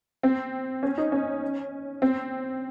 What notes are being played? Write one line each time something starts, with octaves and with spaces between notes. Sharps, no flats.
C4
C#4
D#4
C#4
C4